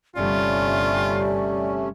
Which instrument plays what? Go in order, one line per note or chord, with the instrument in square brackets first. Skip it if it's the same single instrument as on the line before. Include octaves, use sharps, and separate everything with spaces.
[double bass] G1 G3 [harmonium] C3 A3 C#4 [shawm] F4 [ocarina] D5